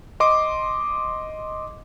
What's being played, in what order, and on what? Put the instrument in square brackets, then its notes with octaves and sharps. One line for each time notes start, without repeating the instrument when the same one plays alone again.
[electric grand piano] D#5 C6 D6